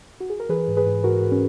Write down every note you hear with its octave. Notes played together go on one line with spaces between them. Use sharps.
F#4
G#4
A#4
E3 G#4 B4
G#2
G#4 B4
G#2
G#2 F#4 A#4
G#2
C#4